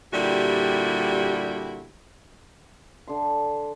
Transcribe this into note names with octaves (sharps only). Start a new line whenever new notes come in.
A#2 D3 G3 E4 F#4 G4
D3 C6